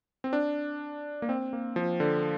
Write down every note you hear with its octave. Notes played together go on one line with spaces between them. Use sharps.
C4
D4
A#3
C4
A#3
F3
D3